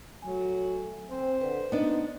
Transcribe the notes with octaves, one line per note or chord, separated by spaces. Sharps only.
F#3 A3 G#5
C4 C5
D3 B4
B3 D4 D#4